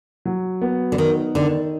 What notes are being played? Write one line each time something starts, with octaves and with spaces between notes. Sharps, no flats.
F#3
B3
D3
D#3 D#4
D3 D#3